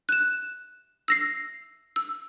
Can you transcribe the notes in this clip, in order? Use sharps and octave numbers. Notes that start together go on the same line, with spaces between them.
F#6 E7
E6 A#6 C7
E6